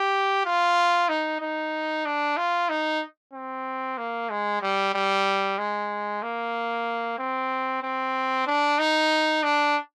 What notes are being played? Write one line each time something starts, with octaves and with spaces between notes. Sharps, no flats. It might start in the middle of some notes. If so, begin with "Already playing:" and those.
Already playing: G4
F4
D#4
D#4
D4
F4
D#4
C4
A#3
G#3
G3
G3
G#3
A#3
C4
C4
D4
D#4
D4